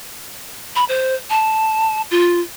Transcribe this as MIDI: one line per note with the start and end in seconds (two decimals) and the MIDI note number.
0.76 0.85 83
0.89 1.15 72
1.30 2.02 81
2.11 2.40 65